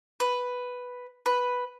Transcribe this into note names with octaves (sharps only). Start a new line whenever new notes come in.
B4
B4